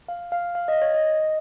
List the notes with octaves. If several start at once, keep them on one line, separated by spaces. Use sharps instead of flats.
F5
F5
F5
D#5
C#5
D#5